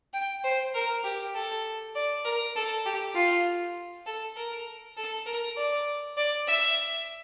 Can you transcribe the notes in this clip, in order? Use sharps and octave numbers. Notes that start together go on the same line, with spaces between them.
G5
C5
A#4
G4
A4
D5
A#4
A4
G4
F4
A4
A#4
A4
A#4
D5
D5
E5